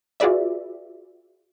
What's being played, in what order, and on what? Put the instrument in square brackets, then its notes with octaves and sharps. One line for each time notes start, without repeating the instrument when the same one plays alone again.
[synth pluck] F4 F#4 G#4 B4 D5 E5